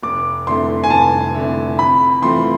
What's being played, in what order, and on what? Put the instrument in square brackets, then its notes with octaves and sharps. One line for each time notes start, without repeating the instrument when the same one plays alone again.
[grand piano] F1 [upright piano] D6
[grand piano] F2 D3 A3 E4 [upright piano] C6
[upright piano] G#5
[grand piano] F1 [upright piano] A5
[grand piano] F2 D3 A3 E4
[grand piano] F2 [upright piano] B5
[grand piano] E3 A3 C4 F4 [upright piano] C6